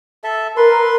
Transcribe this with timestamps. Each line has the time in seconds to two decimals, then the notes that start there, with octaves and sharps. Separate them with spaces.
0.24 A4 E5
0.57 A#4 B4 C6